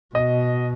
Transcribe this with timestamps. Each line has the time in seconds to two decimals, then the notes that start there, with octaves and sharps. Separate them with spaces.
0.15 B2 D#5